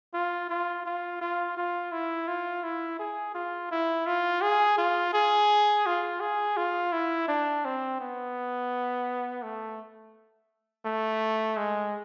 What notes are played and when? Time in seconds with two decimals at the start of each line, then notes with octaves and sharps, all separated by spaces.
0.14 F4
0.50 F4
0.86 F4
1.21 F4
1.57 F4
1.92 E4
2.28 F4
2.64 E4
2.99 G#4
3.35 F4
3.71 E4
4.07 F4
4.42 G#4
4.78 F4
5.13 G#4
5.86 F4
6.21 G#4
6.57 F4
6.93 E4
7.28 D4
7.65 C4
8.00 B3
9.43 A3
10.85 A3
11.57 G#3